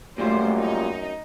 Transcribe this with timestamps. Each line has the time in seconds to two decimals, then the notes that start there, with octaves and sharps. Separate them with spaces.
0.18 F#2 A#2 G3 A3 F4 C5
0.59 D#4